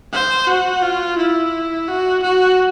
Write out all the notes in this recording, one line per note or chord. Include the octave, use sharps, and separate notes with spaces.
C5
F#4
F4
E4
F#4
F#4